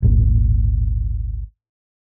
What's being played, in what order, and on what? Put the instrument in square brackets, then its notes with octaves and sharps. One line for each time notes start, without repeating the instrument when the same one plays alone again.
[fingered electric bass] D1 G#1 A#2